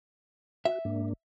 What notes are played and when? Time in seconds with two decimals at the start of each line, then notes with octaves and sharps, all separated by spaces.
0.65 F#4 E5
0.85 G#2 A#3 D4